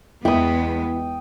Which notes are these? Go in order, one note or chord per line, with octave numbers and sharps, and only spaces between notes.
E2 G#3 B3 E4 G5 D#6